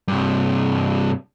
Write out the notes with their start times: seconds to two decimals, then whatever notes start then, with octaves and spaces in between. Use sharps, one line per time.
0.08 G2 C3